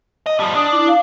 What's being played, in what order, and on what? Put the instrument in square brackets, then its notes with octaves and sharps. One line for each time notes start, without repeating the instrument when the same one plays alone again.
[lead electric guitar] D#5
[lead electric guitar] F3 G3 [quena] A5
[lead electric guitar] D4 [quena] D#6
[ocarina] E4 [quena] D6
[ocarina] F5